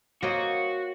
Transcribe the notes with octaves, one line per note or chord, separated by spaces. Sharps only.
A#3 F#4 C5 C#5 D#5